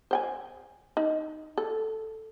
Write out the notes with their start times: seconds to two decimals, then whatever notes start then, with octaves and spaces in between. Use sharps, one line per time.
0.11 C5 G5 G#5
0.97 D#4
1.57 A4